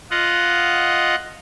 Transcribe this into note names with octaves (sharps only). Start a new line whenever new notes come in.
F4 D#5 F#5